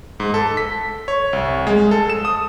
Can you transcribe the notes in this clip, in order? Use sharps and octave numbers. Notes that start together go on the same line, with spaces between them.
G#2
A4
B6
C#5
C2
G#3
A4
E7
D#6